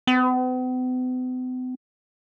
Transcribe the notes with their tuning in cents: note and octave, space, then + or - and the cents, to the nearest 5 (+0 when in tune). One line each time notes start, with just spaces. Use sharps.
B3 +45